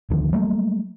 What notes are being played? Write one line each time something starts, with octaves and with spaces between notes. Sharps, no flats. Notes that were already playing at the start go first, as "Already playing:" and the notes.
D2 D3 D#3 F3
F#3 G3 A3 A#3